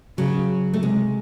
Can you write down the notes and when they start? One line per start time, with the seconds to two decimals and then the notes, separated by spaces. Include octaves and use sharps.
0.18 C#3 F#3
0.74 A3
0.82 C3 G#3